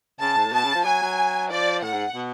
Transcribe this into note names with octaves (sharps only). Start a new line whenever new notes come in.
C#3 A5
G#2
A2
B2 A5
C#3
F3
F#3 G#5
F#3
F3 D5
A2 F#5
G#2
B2